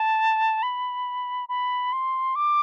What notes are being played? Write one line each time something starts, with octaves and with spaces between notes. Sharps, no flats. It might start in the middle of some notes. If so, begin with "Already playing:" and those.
Already playing: A5
B5
B5
C6
D6